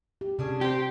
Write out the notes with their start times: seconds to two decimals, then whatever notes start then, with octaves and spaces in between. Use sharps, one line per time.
0.21 G4
0.39 C3 C#4 D4 G#4
0.61 C4 G4 C5